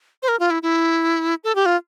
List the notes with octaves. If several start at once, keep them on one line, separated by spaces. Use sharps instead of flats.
C5
A#4
F4
E4
E4
A4
G4
F4